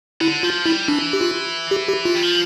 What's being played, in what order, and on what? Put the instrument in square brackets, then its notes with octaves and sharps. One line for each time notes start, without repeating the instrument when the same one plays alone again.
[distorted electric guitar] D3 [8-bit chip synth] E4
[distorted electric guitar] F3 [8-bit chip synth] F4
[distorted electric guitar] G3 [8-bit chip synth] E4
[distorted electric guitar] E3 [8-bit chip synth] D4
[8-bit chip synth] G4
F4
G4
G4
F4
[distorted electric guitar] G3
F3